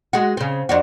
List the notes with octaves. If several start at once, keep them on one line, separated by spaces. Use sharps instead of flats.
G#3 F#4
C#3 C4
F2 D4 F#4